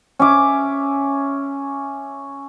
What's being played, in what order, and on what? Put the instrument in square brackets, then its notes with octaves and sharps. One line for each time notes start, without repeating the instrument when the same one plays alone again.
[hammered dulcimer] C#4 E5 D6